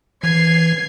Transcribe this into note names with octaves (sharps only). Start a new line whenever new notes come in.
E3 G#6 C7